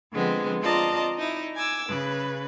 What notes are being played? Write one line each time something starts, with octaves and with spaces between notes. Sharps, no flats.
D3 F3 G#3 B3 C4
C4 F4 D5 D#5 A5 A#5
D#4 E4
G#5 D6 E6
C#3 B4